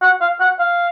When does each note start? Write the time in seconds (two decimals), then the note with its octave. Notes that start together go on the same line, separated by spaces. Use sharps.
0.02 F#5
0.21 F5
0.40 F#5
0.59 F5